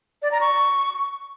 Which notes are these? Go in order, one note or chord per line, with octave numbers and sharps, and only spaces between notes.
D5
A#5
C#6